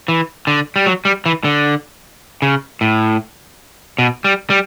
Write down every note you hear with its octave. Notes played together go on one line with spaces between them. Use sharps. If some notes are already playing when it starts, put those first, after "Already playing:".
E3
D3
G3
F#3
G3
E3
D3
C#3
A2
B2
G3
G3